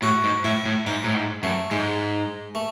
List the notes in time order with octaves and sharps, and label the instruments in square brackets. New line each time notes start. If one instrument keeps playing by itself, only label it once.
[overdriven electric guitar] A2 [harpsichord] F#4
[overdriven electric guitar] G#2
[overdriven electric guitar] A2 [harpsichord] E4
[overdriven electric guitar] A2
[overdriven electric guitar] G#2 [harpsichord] D#4
[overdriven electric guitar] A2
G#2
[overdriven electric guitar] F#2 [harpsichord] A3
[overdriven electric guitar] G#2 [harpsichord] G#3
[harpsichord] A3